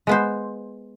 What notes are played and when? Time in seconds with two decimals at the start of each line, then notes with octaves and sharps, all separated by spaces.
0.07 G#3 B3 C5